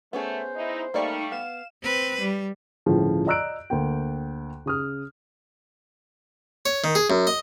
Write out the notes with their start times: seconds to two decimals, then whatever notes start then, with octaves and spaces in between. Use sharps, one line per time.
0.13 A3 B3 C#4 G#4 C5
0.56 D#4 E4
0.94 G3 A3 A#3 D#4 A#4 D5 F5 C#6
1.32 B3 F5 E7
1.82 C4 B4
2.21 G3
2.86 G1 C#2 A2 C#3 F3
3.26 D5 D#5 A#5 E6 F#6 D7
3.70 D2 A#3 G5
4.66 C#3 D#6 F6
6.66 C#5
6.84 D#3
6.95 G#4
7.10 F#2
7.27 D#5